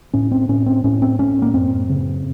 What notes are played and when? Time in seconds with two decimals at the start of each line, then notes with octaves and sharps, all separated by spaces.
0.14 A2 C#4
0.31 C4
0.49 A2 C#4
0.66 C4
0.84 A2 C#4
1.02 C4
1.19 A2 C#4
1.42 A#3
1.54 F#2 C4
1.89 C#3